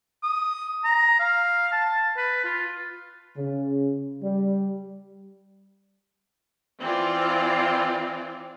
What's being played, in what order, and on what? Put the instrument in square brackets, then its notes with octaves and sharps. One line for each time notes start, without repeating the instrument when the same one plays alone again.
[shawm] D#6
A#5
F5
A5
B4
F4
[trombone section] C#3
G3
[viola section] E3 C4 F4 D5